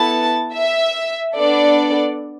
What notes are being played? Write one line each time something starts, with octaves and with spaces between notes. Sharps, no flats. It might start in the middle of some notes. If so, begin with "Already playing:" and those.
Already playing: B3 E4 A4 A5
E5
B3 D4 A4 D5